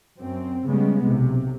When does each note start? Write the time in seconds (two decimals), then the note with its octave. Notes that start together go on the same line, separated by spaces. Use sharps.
0.18 F#2 C4
0.67 C#3 G3 G#3 B3
1.04 B1 C3